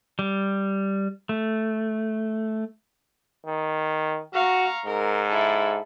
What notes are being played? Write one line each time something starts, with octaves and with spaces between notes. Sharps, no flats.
G3
A3
D#3
F#4 F5 A#5 C#6
G#2 A#4
E4 A4